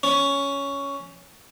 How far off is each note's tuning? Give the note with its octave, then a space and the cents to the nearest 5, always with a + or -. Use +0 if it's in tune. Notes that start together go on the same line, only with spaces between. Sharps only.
C#4 +10